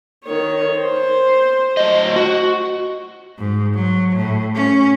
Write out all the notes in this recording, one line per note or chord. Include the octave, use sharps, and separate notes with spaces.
D#3 C#5
C5
A2 F#3 D#5
F#4
G#2
F#3
A2
C#4